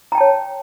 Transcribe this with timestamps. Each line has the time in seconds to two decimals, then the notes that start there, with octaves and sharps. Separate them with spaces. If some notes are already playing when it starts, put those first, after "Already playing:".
0.12 A#5
0.15 G5
0.18 A5
0.20 C#5